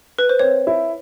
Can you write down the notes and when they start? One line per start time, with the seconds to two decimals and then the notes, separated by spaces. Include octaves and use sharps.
0.19 B4
0.29 C5
0.39 C4 C#5
0.67 E4